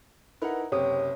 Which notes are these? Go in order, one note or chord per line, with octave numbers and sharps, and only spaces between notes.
D#4 E4 A#4 B4 F#5
F#1 C3 G4 C#5 D#6